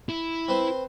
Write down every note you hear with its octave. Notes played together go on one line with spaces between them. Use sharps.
E4
C4 B4 C5